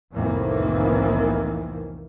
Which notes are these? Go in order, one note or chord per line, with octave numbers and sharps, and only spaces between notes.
C2 F2 A2 D#3 E3 A#3